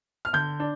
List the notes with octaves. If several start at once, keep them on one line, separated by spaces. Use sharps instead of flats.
F6
D3 G6
D4